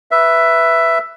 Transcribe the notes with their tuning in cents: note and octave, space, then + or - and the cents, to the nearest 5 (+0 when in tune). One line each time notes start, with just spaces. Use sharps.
B4 -5 E5 +10